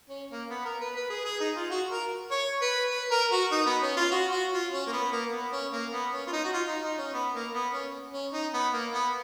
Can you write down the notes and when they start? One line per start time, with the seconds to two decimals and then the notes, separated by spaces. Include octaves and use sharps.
0.09 C#4
0.31 A#3
0.50 B3
0.65 A#4
0.81 B4
0.96 B4
1.10 G#4
1.25 G#4
1.40 D#4
1.56 F4
1.71 F#4
1.90 A#4
2.31 C#5
2.62 B4
2.91 B4
3.11 A#4
3.32 F#4
3.52 D#4
3.66 B3
3.82 C#4
3.97 F4
4.11 F#4
4.32 F#4
4.53 F4
4.72 C#4
4.87 A#3
4.93 B3
5.12 A#3
5.32 B3
5.52 C#4
5.72 A#3
5.92 B3
6.13 C#4
6.27 F4
6.33 D#4
6.45 F#4
6.53 F4
6.67 D#4
6.83 D#4
6.98 C#4
7.13 B3
7.34 A#3
7.54 B3
7.73 C#4
8.13 C#4
8.33 D#4
8.54 B3
8.73 A#3
8.93 B3